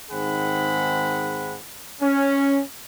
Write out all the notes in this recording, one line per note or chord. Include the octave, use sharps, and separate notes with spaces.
G#2 D#3 C4 G#4 F#5 B5
C#4